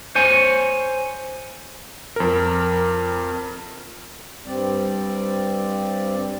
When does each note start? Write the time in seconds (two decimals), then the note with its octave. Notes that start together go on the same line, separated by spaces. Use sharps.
0.15 C5 C#5 G#5
2.16 F2 A#4
4.46 G2 G3 C4 D5